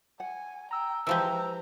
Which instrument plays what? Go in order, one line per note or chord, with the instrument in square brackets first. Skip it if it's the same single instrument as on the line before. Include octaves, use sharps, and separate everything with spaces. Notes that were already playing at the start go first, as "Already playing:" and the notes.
[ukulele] F#5 [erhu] G#5
[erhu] G5 [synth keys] A#5 E6
[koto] E3 F3 G#3 [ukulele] G4 B4 E5 [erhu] A#5 [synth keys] E6